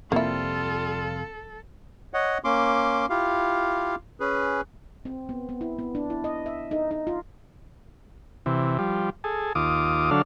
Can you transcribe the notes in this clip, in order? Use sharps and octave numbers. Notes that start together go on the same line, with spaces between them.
F2 C3 G3 A#3 C4 E4 F4 A4
C#5 D#5 F#5
A#3 C#4 C6 D6
E4 F4 G4 F5
C#4 G#4 B4
C4
B3
B3
E4
B3
D4
E4
D#5
E5
D#4
D#4
F4
C3 E3
F3 G3
G#4 A4
D#2 F4 D6 D#6
D3 F#3 D4 A4 F5